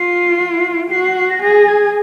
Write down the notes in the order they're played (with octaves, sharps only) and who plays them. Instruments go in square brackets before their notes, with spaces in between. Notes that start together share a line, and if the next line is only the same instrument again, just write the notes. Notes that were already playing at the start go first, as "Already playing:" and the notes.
Already playing: [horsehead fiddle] F4 [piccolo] C7
[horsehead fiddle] F#4 [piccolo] C7
[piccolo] C7
C7
A#6
[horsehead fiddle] G#4 [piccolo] A#6
[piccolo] G#6